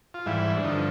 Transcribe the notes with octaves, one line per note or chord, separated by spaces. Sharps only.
F4
G#2 E3 G3 E4
D4
G2 D3 F3 D#4